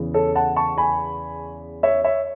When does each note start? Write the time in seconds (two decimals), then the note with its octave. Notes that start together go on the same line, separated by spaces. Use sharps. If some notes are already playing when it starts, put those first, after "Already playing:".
Already playing: E2 C#3 E3
0.14 A4 C#5
0.35 F#5 A5
0.56 A5 C#6
0.78 G#5 B5
1.83 C#5 E5
2.04 C#5 E5